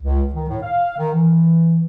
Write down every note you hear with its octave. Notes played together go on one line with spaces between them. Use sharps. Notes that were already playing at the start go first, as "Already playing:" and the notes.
C#2
D#3
A2
F5
D#3
E3